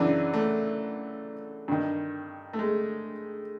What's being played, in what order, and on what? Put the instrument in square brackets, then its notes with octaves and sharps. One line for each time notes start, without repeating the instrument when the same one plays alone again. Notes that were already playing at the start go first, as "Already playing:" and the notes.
Already playing: [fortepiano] F#2 C#3 E3 D4
A3
G2 D#3
A3
G#3